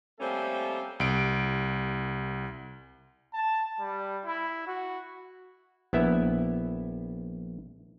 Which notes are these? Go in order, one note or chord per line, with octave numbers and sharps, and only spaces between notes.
G3 A3 A#3 C4 C#4 A4
C2 D7
A5
G3
E4
F#4
A#1 B3 E4 E5